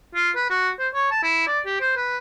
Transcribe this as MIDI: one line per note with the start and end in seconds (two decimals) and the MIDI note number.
0.15 0.30 65
0.36 0.45 71
0.50 0.70 66
0.79 0.88 72
0.94 1.08 73
1.11 1.20 81
1.23 1.47 64
1.47 1.60 74
1.66 1.76 67
1.81 1.94 72
1.96 2.18 71